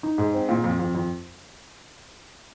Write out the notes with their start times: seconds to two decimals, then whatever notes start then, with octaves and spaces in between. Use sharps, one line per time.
0.03 D#4
0.18 G#2
0.34 C4
0.49 A#2
0.64 F2
0.79 F2
0.95 F2